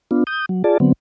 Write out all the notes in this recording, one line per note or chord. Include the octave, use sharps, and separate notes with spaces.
B3 D4 F4
D#6 G6
F#3
F4 G#4 D5 A5
D3 F#3 B3 C4